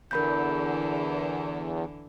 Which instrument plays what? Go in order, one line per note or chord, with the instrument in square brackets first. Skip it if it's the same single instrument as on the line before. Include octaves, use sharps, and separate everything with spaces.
[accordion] E2 [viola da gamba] D3 E3 [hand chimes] A#4 B5 G6